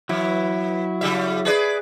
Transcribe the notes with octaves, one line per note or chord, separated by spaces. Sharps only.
E3 F#3 E4
C#3 G3 E5
G#4 B4 D5